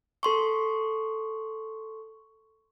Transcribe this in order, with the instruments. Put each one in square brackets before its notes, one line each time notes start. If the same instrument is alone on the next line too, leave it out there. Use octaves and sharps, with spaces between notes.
[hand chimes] A4 C6 C#6